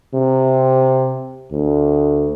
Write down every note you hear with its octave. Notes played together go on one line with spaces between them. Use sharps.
C3
D2